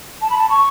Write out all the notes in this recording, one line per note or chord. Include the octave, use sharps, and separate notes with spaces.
A5
B5
A5
C#6